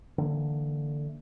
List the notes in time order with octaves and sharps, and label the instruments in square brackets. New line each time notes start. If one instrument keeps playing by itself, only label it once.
[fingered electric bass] D3 E3 A#3